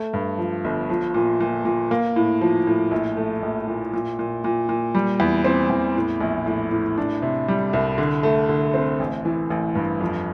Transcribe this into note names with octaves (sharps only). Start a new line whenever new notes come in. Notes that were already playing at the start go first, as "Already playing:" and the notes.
Already playing: A3
G2
F3
G1
F3
A#2
A#2
A#2
A#3
A2
F3
A2
A#1
A3
A#1
A#2
A#2
A#2
A#2
A#2
G3
E2
C4
E2
A2
A#1
A2
A2
D4
C3
G3
C2
D3
A3
D3
C4
A1
E3
A1
G2
F2